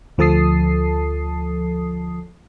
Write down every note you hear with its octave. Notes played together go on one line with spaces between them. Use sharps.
D2 F3 A4 A5 D#6 C7